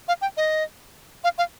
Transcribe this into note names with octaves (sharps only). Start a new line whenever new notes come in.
F5
G5
D#5
F5
F5